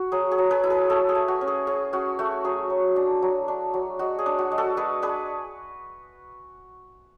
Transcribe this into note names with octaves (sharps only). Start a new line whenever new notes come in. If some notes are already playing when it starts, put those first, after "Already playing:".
Already playing: F#4
F#3 G#4
G#4
F#3
G#4 B4
E4
G#4 B4
A3 A4 C#5
G#4
A3
F#4
C#4
G#4
C#4 G#4
C#4 F#4
A3 F#4
F#3 G#4
F#3
D4
F#3
D4
F#3
G#3 F#4
G#4
D4
F#4
G#3
F#4 A4
G#3 G#4 B4
D4 G#4 B4